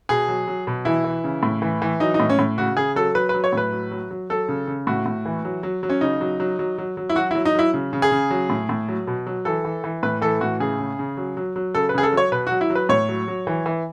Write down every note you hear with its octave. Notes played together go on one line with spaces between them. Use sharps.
B2 G#4
F#3
F#3
B2
E3 E4
E3
C#3
A2
E3
E3
F#3 D#4
D#4
A2
C#4
A2
C#3 F#4
C#3 G#4
F#3 A4
F#3 B4
F#3 B4
C#5
A2 B4
F#3
F#3
F#3
F#3 A4
C#3
C#3
A2 F#4
A2
E3
F#3
F#3
F#3
C#4
C#3 D#4
F#3
F#3
F#3
F#3
F#3
E4
F#3 F#4
F#3 E4
D#4
F#3 E4
C#3
C#3
G#4
C#3
F#3
A2
A2
F#3
B2
F#3
E3 A4
E3
E3
A2 B4
E3 A4
A2 F#4
C#3 G#4
C#3
C#3
F#3
F#3
F#3
C#3 A4
B4
C#3 G#4
A4
F#3 C#5
B2 B4
F#3 F#4
E4
F#3
B4
A2 C#5
F#3
F#3
E3
E3